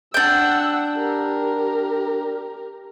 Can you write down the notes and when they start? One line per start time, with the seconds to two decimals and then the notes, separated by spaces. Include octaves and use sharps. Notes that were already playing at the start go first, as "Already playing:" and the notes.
0.14 D4 F#5 G5 E6
0.97 G4 A#4